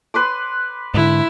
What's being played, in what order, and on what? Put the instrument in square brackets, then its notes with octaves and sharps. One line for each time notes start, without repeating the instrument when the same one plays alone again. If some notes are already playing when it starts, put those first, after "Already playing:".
[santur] B4 C6 D6
[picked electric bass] G#2 D3 [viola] E4